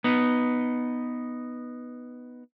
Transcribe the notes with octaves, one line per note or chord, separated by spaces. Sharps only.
B3 D#4